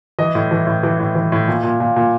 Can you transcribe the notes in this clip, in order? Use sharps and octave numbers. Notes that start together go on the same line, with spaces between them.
E3 D#5
A2
E3
A2
E3
A2
E3
A2
A#2
A#2
A#2
A#2